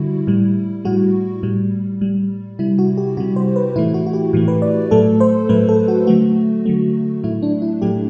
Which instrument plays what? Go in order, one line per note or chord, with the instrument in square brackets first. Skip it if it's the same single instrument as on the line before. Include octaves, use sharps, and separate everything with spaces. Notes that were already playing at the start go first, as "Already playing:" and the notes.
Already playing: [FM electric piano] D3 G3 E4 F#4
A2 G3
A2 G3 F#4
A2 G3
A2 G3
C3 G3 E4
F#4
G4
C3 G3 F#4
C5
B4
A2 E3 A3 E4
F#4
F#4
G4
A2 E3 A3
B4
D5
A2 F#3 A3 A4
C5
A2 F#3 A3 B4
A4
F#4
D3 F#3 A3 F#4
D3 F#3 A3
A2 F#3 A3 E4
D4
E4
A2 F#3 A3 G4